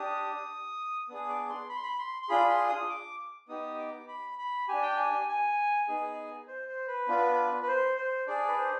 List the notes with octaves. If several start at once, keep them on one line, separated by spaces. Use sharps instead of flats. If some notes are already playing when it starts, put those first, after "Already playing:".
Already playing: D4 G4 D#6
B3 D4 G#4 D#6
D6
C6
B5
C6
B5
C6
C6
D4 F4 G#4 B5
C6
D#6
D6
B3 D#4 G4 D#6
D6
B5
B5
D4 G4 G#5
G5
G#5
G#5
B3 D#4 G#4
C5
C5
B4
B3 D4 F4
B4
C5
C5
D4 G#4 D5
B4
C5